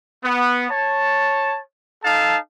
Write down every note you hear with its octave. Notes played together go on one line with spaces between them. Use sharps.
B3
C#5 A5
D#4 A4 F5 A5